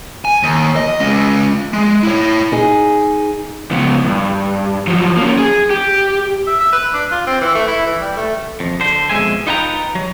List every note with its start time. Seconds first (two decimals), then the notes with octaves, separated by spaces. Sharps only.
0.25 G#5
0.43 D#2
0.76 D#5
1.00 G#3 C#4
1.73 G#3
2.03 E4 C#5
2.52 D#4 G#4
3.71 C#2 B3
4.04 E2 G2
4.87 F3 F#3
5.17 A#3 C#4
5.39 G#4
5.70 G4
6.47 E5
6.60 E5
6.73 B4
6.93 D4
7.12 F4
7.27 C4
7.41 E3
7.55 A3
7.67 E4
7.86 E3
8.01 G3
8.17 A3
8.60 F2
8.81 D3 C5
9.09 F2 B2 G#3 E5 G#5
9.47 D#4 F4 B4 G5 G#5 A#5
9.95 F#3